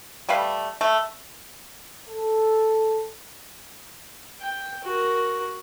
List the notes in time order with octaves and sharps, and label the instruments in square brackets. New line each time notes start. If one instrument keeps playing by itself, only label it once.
[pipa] G3 A3 B4 F5
A3
[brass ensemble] A4
[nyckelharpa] G5
F#4 A#4